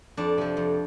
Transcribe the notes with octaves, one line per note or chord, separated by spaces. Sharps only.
F2 D4
C3 F3
F2